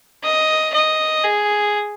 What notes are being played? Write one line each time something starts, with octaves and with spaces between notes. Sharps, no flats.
D#5
D#5
G#4